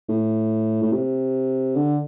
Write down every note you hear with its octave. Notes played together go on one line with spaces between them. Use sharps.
A2
A2
C3
D3